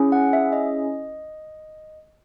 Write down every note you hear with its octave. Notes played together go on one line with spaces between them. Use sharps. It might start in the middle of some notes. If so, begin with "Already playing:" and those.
Already playing: C#4 E4 G#4
F#5
E5
D#5